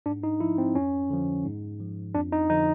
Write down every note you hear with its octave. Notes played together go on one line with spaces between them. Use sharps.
G#2 D4
D#4
F3 E4
C4
F2 C#4
D3 F3
G#2
F3
F2 D4
D#4
D3 F3 D#4